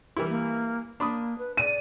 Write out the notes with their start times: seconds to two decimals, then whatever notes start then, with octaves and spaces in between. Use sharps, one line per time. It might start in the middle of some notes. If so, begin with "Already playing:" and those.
0.17 E3 G3 E4 A#4
0.29 A#3
1.00 A#3 D4 B5 D#6
1.38 B4
1.57 D5 D#7